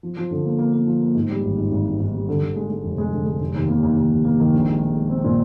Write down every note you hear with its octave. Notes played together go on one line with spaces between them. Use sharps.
F3
F3
D3
A#3
A#3
A#3
F3
A#3
G#2
G3
G#1
G#2
G#1
G#2
G#2
G3
D3
D3
G#3
G#3
F1
G#3
D3
G#3
F1
D#2
A#3
D#2
D#2
F1
A#3
D#3
A#1
G#3
G#3
G#3
C4
A#2